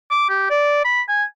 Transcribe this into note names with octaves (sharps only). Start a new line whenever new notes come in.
D6
G4
D5
B5
G#5